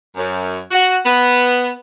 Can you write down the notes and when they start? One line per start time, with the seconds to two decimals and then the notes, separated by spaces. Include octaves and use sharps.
0.16 F#2
0.71 F#4
1.05 B3